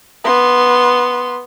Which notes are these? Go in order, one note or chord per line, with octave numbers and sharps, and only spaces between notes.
B3 C6